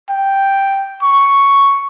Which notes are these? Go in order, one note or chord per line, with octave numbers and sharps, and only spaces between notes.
G5
C#6